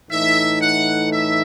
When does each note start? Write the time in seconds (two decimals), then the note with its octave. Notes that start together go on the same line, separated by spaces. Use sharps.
0.10 A2 E3 A3 D#4 E5
0.61 F#5
1.13 E5